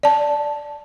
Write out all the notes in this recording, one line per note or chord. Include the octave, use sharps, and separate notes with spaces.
D5 A5